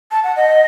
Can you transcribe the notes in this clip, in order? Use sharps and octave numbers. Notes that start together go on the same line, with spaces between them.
A5
F#5
D#5